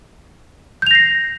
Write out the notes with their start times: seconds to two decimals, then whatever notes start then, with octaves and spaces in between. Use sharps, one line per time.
0.82 G6
0.87 F7
0.91 A#6
0.95 C7